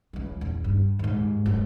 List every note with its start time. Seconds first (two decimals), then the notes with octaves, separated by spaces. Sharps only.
0.13 C#2 E3
0.41 E2 C#3
0.64 G2
0.99 D#2 G#2
1.46 G#1 F#2